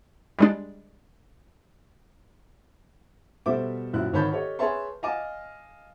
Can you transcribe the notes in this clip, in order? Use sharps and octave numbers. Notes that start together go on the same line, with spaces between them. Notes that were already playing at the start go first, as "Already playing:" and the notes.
G3 G#3 D4
B2 G3 A4 C5 E5 D6
A#1 F#2 E4 F#6
G#1 D#3 C#5 A5 B5 G6
G4 A4 C#5 D#5
G#4 B4 C#5 E5 A5 C6
D#5 F5 G#5 A5 D6